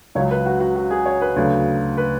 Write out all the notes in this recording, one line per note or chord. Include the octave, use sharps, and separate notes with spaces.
C#2 C#3 F#3 C#5
B4
F#4
F#4
F#4
G#4
C#5
B4
D2 C#3 F#3
B4